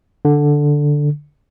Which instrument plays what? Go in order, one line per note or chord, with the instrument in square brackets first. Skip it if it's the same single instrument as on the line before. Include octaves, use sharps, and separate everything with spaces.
[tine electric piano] D3